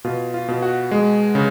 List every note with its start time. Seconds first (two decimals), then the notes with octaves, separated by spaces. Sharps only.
0.04 B2 F4
0.34 F4
0.48 B2
0.62 F#4
0.91 G#3
1.35 C#3